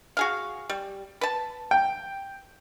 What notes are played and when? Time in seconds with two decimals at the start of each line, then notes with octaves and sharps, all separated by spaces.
0.17 F#4 G#4 F5
0.69 G3
1.21 B4 A5
1.71 G5